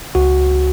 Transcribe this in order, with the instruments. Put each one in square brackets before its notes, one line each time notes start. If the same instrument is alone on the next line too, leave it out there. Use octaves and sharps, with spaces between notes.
[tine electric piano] C#2 F#4